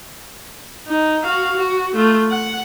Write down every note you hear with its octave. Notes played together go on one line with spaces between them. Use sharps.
D#4
F#4 F5
F#4
A3 F4
F#5